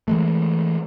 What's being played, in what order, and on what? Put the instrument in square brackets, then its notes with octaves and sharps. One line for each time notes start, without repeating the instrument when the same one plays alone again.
[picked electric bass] E3 G#3 A3